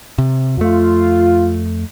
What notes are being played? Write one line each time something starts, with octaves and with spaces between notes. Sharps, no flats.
C3
F2 A3 F4